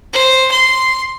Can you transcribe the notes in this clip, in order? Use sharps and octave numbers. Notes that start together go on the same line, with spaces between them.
C5
C6